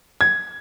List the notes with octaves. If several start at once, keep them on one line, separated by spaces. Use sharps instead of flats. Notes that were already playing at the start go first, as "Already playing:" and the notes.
G#6